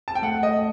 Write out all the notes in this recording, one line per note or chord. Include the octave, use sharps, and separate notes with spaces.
A5
G5
A3 F#5
A3 D#5